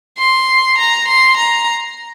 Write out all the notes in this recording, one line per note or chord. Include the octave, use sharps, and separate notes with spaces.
C6
A#5
C6
A#5